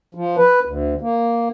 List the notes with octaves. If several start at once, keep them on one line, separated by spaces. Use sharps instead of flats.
F3
B4
D2
A#3